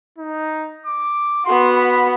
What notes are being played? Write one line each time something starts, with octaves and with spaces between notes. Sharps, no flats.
D#4
D6
B3 F#4 C6
B5